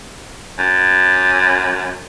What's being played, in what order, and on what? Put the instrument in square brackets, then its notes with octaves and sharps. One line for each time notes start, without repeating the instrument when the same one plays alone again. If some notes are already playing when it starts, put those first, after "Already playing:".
[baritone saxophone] F#2